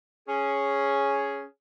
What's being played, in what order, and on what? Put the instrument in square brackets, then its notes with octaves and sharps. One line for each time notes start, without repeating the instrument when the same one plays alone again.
[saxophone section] C#4 G#4